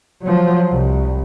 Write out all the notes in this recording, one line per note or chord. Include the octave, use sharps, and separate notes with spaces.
F3 F#3
C2